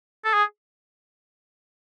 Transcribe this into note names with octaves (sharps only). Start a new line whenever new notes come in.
A4
G#4